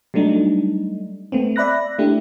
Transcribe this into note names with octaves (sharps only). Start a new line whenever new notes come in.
F#3 G3 A3 D4 D#4
A3 B3 C4
D5 E5 B5 F#6 A#6
A3 D4 E4 G4